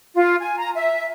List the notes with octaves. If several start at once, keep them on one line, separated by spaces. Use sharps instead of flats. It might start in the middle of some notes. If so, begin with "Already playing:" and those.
F4
G#5
A#5
E5